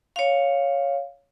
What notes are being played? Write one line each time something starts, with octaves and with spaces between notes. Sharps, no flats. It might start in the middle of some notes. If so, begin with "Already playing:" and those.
C#5 F5